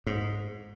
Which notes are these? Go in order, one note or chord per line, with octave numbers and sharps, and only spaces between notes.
G#2